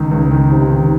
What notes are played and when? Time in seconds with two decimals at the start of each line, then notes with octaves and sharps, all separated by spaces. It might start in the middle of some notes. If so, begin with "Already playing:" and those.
Already playing: C#2 D#3
0.11 C#2
0.31 D#3
0.51 C3
0.71 D#3